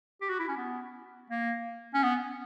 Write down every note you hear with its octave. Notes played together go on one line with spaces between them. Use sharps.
G4
F#4
E4
C#4
B3
A#3
C#4
B3